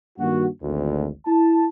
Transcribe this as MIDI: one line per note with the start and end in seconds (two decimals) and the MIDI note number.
0.19 0.46 43
0.19 0.46 51
0.19 0.46 58
0.19 0.46 62
0.19 0.46 66
0.63 1.08 32
0.63 1.08 38
1.27 1.66 64
1.27 1.66 81